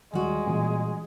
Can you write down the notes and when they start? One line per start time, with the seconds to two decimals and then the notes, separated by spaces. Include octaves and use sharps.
0.14 D#2 D#3 G3 G#3 F#4
0.47 A#2 E3 C#4